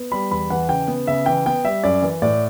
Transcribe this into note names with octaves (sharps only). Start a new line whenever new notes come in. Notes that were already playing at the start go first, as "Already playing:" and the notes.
Already playing: B3
G3 B5
E2 B5
E3 F#5
C#3 G5
B3
C#3 E5
E3 G5
B3 G5
G3 E5
F#2 D5
E3
A2 D5